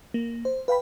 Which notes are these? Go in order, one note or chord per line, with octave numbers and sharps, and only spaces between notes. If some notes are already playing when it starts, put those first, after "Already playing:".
A#3
C5
B4 F5 G5 B5